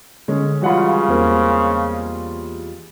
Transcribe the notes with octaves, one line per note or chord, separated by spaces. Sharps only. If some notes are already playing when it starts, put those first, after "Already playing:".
D3 G#3 C#4
C#3 E3 G3 G#3 F4 F#4 F#5 B5
E2 A#3 C4